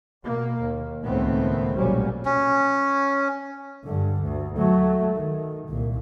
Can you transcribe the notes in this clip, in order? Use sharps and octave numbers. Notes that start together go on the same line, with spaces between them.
B2 A#3
D#2
C#2 A2 D#3 A3 B3 C4
F1 B1 A#2 F#3 G3 C#4
C#4
G2 D3
D2
F#3 A3
D#3
C2 A#2